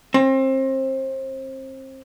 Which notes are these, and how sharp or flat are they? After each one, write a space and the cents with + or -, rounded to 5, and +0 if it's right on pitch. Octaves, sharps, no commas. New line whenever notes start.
C4 +30